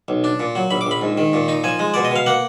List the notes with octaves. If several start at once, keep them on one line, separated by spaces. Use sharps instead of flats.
B1
D4
A#2
F#3
A#1 B5
D6
A#1 B5
G#2
D#3
A#2
D#4
F3 G#5
G#3
B2 D5
D#5
B2 F5
A#3 F#5